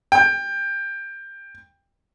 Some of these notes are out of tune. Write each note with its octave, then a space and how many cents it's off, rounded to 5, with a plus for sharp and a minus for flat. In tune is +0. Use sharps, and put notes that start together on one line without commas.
G5 +20